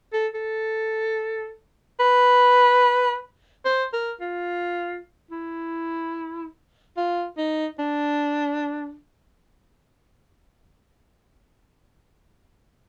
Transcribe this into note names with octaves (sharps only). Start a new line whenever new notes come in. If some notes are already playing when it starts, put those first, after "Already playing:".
A4
A4
B4
C5
A#4
F4
E4
F4
D#4
D4